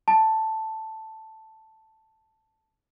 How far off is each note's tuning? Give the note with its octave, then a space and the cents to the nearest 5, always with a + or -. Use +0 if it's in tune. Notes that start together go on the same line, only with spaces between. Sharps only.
A5 +5